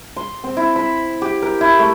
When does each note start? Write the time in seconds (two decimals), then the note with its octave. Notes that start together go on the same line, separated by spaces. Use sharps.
0.16 C6
0.44 C4
0.57 E4
0.76 B5
1.22 G4
1.42 A#4
1.61 E4
1.79 A3